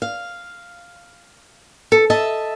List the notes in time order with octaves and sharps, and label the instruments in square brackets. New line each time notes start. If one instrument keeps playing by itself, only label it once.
[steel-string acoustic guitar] F5
A4
D#5 E5 A5